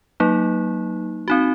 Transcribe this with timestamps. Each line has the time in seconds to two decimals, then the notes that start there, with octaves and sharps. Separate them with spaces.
0.20 F#3 A#3 D#4
1.28 C4 D#4 F#4